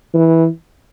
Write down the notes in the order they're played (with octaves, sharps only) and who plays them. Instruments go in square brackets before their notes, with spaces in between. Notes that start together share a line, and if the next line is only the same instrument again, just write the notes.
[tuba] E3